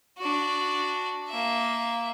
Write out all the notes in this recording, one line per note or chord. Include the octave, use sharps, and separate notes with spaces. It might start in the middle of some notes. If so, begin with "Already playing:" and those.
D4 F#4
A#3 E5